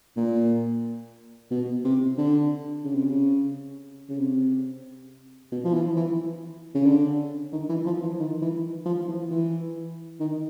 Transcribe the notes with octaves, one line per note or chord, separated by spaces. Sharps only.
A#2
B2
C3
D3
C#3
C3
C#3
C#3
C3
B2
F3
E3
E3
C#3
D3
D#3
E3
F3
E3
D#3
E3
F3
E3
E3
D#3